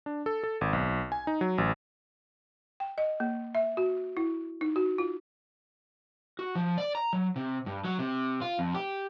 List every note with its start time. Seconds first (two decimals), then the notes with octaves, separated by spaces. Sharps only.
0.06 D4
0.26 A4
0.43 A4
0.61 G#1
0.73 B1
1.12 G#5
1.27 D#4
1.41 F#3
1.58 A1
2.80 G5
2.98 D#5
3.20 A#3
3.55 E5
3.77 F#4
4.17 E4
4.61 D#4
4.76 F#4
4.98 F4
6.39 F#4
6.55 F3
6.78 D5
6.95 A#5
7.13 F#3
7.36 C3
7.66 G2
7.85 F#3
7.99 C3
8.42 F4
8.59 F2
8.74 G4